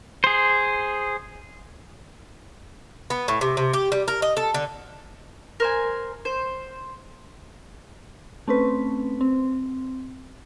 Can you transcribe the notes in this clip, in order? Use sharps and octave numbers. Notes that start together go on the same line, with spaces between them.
G#4 C5
B3
A2
C3
C3
G4
G3
A#4
D#5
A4
D3
A#4 C5 G#5
C5
A3 C4 C#4 B4
C4